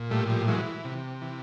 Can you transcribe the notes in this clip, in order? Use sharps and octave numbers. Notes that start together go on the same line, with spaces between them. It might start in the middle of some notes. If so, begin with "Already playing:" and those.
Already playing: A#2
A2 G3 A3
F3 G3
E3 F#3 G#3
C3
E3